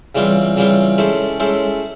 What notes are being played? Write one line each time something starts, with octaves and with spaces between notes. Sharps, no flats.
C#3 E3 G3 C4 F4
C#3 E3 G3 C4 F4
G#3 C#4 E4 A4 C5
G#3 C#4 E4 A4 C5